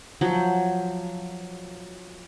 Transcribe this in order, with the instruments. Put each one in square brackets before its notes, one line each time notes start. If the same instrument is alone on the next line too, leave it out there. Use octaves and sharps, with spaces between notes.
[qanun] F3 F#3